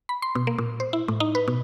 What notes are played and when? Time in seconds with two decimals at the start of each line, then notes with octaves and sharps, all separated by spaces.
0.09 B5
0.22 C6
0.35 B2
0.47 A#3
0.58 A#2
0.80 C5
0.93 E4
1.08 A2
1.20 D#4
1.35 B4
1.48 B2